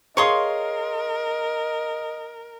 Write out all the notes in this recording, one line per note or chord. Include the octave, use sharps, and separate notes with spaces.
G#4 A#4 C#5 D#5 F5 C6 D#6